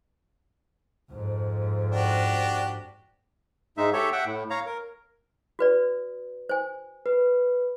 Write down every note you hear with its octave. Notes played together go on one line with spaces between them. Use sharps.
F2 G#2
D4 F#4 G4
G#2 G#3 D#4 E5
G4 A4 C#5 E5
E5 F#5 G5
A2
C#5 F5 A#5
A#4
F#4 B4 D5
C5 G#5
B4